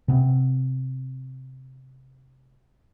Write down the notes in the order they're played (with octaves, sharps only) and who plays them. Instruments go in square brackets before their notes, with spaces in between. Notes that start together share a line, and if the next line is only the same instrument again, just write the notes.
[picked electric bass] C3 B3 C4